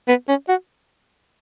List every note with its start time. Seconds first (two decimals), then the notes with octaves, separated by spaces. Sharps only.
0.08 B3
0.28 C#4
0.49 F#4